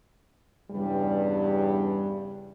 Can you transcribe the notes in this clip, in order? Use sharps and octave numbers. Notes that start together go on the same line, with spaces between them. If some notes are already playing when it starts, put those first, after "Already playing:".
E2 G2 C#3 G3